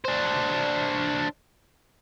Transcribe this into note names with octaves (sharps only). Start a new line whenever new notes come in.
D4 C5